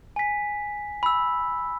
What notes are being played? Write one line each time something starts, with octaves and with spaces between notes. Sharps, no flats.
G#5 B6
B5 E6